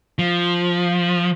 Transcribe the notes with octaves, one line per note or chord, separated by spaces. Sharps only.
F3